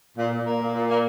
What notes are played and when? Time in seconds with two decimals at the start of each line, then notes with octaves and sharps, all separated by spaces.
0.18 A#2
0.33 A#2
0.46 A#3
0.61 A#2
0.75 A#2
0.89 A#3